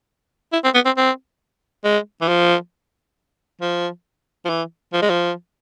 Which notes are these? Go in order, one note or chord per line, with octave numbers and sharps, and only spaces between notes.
E4
C4
B3
C4
C4
G#3
E3
F3
F3
F3
E3
F3
G#3
F3